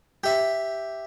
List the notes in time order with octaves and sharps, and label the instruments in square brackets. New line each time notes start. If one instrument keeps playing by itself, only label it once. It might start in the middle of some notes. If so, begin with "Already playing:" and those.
[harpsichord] G4 E5